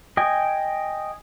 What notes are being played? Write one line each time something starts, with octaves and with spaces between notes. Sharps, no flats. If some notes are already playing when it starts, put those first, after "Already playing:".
D#5 G5 G#5